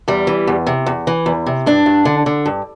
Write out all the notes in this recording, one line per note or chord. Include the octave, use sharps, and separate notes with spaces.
E2 G3
E3
E2
C3
E2
E3
E2
C3
G2 D4
G2
D3
D3
G2